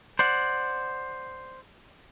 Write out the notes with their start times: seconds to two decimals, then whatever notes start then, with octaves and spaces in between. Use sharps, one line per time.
0.19 C5 D5 F#5